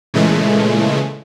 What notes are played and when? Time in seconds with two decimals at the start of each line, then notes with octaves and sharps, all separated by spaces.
0.14 A#2 C#3 E3 G#3 A3